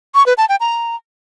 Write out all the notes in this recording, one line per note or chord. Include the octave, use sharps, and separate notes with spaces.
C#6
B4
A5
G5
A#5